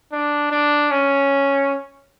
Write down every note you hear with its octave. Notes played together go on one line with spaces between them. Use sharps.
D4
D4
C#4